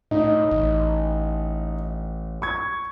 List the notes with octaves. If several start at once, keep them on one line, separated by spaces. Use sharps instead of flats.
A2 D#4
A1
C#6 G#6